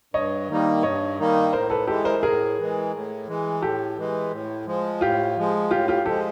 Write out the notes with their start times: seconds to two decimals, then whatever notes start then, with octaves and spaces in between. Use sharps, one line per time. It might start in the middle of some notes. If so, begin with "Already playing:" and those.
0.14 G2 C#5 D#5
0.48 D#3 G3 A#3 D#4
0.83 G2 C#5 D#5
1.19 D#3 G3 A#3 D#4
1.53 A2 A#4 C5
1.70 A4 B4
1.87 E3 G#3 G4 A4
2.05 A#4 C5
2.23 A2 G#4 A#4
2.57 E3 G#3
2.93 A2
3.28 E3 G#3
3.62 A2 G4 A4
3.97 E3 G#3
4.31 A2
4.66 F3 G#3
5.01 A2 F4 G4
5.37 F3 G#3
5.71 A2 F4 G4
5.88 F4 G4
6.06 F3 G#3 G4 A4